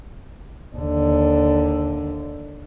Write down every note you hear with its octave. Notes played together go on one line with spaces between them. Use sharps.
D#2 D3